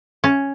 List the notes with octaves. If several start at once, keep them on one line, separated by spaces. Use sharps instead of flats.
C#4